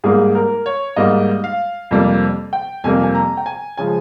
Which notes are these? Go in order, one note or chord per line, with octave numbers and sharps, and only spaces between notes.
G#2 G3 A#3 G#4
A#4
C#5
G#2 G3 A#3 D#5
F5
F2 C3 G3 A#3
G5
F2 C3 G3 A#3 G#5
G#5
A#5
G5
G#5
C#3 F3 G#3 G#5